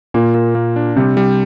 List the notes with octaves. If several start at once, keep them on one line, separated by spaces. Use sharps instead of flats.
A#2 A#3
A#3
A#3
D4
C3 G3
G3